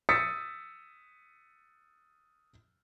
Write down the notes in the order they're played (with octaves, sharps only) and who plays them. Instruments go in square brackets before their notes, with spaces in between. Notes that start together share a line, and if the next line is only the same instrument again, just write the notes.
[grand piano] D#6 E6 A6 B6 C#7